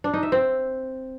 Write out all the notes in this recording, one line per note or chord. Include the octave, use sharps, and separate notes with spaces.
D4
D#4
E5
C4